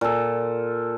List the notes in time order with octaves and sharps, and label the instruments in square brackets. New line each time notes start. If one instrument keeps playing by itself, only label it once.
[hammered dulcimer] A#2 A4